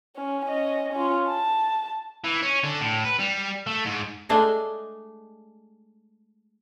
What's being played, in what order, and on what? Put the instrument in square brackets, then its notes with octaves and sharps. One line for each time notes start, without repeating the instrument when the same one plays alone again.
[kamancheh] C#4
C#4 D#5
C#4 F4
A5
[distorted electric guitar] E3
C#4
D3
A2
B4
G3
A3
G#2
[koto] G#3 A3 D4 G#4 D#5